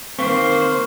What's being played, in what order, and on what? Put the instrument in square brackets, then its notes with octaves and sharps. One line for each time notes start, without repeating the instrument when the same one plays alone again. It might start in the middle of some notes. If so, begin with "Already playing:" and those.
[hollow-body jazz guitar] D#3 C4 [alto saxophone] A#3 [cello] C5 [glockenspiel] C#6